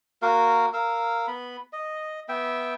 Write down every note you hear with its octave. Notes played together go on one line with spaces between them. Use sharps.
A#3 F#4 A#4 F5
A#4 F5 E6
B3 B5
D#5
B3 E5 G5